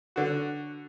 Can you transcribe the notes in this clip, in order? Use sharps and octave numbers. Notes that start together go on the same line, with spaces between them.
D3 F#4